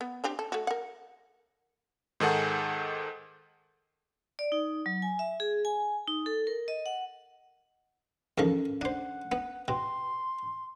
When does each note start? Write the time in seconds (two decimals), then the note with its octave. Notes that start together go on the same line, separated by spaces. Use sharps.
0.01 B3
0.24 C4 D4 G4
0.39 A4
0.52 A3 F#4
0.67 A#4 F#5
2.20 G#2 D#3 G#4 A4 F#5
4.39 D5
4.52 D#4
4.86 F#3
5.02 G#5
5.19 E5
5.40 G#4
5.65 G#5
6.07 D#4
6.26 A4
6.47 A#4
6.68 D#5
6.86 F#5
8.38 E2 D#3 F3 C#4 A4 A#4
8.81 D4 C5 F#5
9.32 B3
9.68 B2 G5 C6